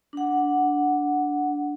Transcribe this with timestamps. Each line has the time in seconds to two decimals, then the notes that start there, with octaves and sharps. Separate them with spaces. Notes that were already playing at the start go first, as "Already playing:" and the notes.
0.13 D4 F#5